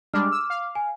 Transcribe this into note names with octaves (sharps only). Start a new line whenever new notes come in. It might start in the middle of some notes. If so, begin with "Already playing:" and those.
G3 G#3 D4 D6 F6
E6
F5
G#5